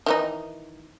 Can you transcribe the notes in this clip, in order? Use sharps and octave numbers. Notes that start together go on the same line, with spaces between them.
D#3 E3 D#4